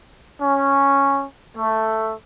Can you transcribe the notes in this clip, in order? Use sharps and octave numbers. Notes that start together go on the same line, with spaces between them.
C#4
A3